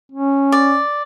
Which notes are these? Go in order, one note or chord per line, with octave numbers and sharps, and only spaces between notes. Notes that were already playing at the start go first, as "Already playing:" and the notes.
C#4
D5